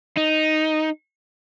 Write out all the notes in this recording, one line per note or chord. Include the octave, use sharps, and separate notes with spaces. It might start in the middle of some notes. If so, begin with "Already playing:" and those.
D#4